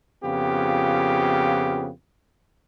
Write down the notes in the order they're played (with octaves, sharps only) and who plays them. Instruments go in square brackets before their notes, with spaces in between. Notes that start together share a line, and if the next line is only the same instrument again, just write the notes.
[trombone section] F2 C#3 B3 F4 G4